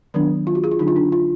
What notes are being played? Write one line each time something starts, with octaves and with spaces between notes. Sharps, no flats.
D#3 F#3 B3 D4
F4
F#4
G#4
F4
D3 F#3 D4 D#4
F4
D4
F4